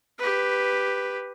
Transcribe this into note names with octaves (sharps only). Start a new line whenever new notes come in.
G4 B4